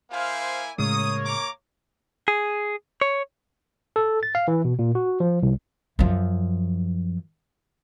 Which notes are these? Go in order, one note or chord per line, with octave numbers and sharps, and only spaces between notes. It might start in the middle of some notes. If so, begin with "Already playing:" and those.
A#3 E4 C5 F5 G#5
A2 C#3 G#3 A#3 C#5 D#6
A#5 D6
G#4
C#5
A4
A6
F5
E3
B2
A#2
F#4
F3
C2
F#2 F3